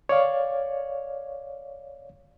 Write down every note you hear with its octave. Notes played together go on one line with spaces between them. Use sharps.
C#5 D5 F5